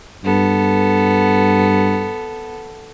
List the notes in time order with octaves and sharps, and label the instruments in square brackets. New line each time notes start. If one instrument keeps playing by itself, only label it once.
[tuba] G2 [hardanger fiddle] B3 A4